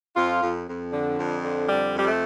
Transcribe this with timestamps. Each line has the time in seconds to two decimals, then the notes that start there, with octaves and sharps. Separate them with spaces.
0.16 F2 F4
0.42 F2
0.67 F2
0.92 D3
1.18 F2
1.43 D3
1.69 F2 G3
1.94 F2 G3
2.06 A3